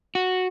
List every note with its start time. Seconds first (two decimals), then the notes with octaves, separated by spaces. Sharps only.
0.15 F#4